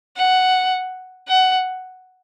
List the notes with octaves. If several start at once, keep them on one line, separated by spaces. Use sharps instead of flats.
F#5
F#5